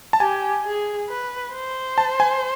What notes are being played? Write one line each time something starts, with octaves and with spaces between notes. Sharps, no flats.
A5
G4 G#5
G#4
B4
C5
A5
G#5